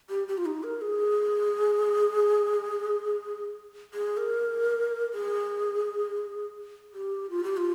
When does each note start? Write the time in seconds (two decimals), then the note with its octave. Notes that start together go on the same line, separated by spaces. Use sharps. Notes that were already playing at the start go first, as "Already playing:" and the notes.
0.10 G4
0.28 G4
0.38 F4
0.46 D#4
0.63 A#4
0.81 G#4
3.94 G#4
4.17 A#4
5.14 G#4
6.94 G4
7.30 F4
7.43 G4
7.57 F4